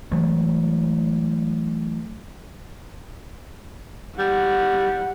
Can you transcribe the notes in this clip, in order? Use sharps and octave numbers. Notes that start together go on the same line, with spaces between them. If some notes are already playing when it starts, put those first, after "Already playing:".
E3 F#3 G#3 A3
G3 F#5